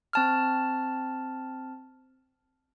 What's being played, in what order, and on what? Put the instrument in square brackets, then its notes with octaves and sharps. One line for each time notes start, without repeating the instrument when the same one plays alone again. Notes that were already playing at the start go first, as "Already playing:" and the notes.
[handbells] C4 A5 F6